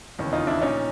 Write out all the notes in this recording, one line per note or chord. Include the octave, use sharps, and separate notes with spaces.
E1 D#2 C#3 E3
D#4 F4
D4 E4
A#1 A#2 C#4 D#4